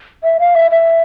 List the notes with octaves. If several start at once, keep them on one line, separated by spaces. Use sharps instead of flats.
E5
F5
E5
E5